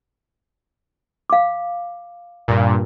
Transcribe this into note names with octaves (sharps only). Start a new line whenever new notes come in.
F5 D6
G2 A#2